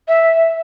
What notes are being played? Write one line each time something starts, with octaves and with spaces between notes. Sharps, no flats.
E5